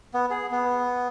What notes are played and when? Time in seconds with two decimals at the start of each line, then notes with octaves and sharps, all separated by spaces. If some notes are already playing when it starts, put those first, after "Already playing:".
0.14 B3
0.30 G#4
0.51 B3